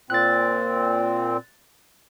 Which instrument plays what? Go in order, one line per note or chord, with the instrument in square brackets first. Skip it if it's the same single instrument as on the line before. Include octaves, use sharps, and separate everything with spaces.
[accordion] A#2 C4 [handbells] F#6 A6